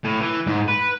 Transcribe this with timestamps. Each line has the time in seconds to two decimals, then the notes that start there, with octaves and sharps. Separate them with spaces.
0.04 A2
0.21 E3
0.47 G#2
0.68 B4